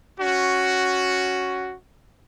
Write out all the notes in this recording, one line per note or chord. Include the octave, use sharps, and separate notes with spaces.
C#4 F#4